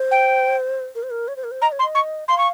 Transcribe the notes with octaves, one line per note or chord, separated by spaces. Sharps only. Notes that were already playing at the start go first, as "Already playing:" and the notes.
Already playing: C5
G5
A#4
C5
A#4
C#5
C5
A#4
C5
D#5 A#5
C#5
C6
D#5
C#6
F5 C6
C#6